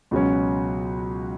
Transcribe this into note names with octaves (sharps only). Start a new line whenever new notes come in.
C#2 B2 F#3 C#4